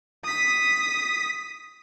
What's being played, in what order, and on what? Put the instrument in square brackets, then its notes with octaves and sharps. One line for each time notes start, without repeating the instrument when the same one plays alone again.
[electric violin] D#6 B6